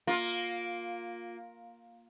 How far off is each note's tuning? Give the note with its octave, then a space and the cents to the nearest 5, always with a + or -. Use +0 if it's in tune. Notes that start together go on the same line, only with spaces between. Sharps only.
A#3 +0 F4 +15